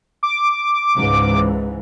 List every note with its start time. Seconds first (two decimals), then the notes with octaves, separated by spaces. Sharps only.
0.23 D6
0.95 C#2 G#2 E3